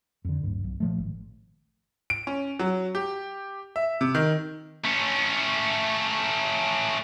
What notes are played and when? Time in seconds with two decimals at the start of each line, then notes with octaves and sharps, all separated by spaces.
0.25 F2 D3
0.44 D1 G2
0.64 B1
0.80 A#2 F3 A3
0.98 G#1
2.10 D7
2.27 C#4
2.59 F#3
2.95 G4
3.76 E5
4.01 C3
4.15 D#3
4.85 A3 C#4